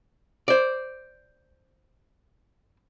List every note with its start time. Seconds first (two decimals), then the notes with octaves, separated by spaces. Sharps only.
0.48 C5 D5